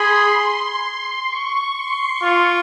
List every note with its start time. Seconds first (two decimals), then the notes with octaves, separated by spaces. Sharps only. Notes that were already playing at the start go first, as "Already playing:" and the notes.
Already playing: G#4 B5 C6
0.29 C6
1.26 C#6
1.74 C6
2.23 F4 C#6